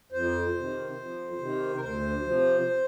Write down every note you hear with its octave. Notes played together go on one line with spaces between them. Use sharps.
F2 C5
C3 D#3
F2
C3 D#3
A#4
D2 C5
C3 F3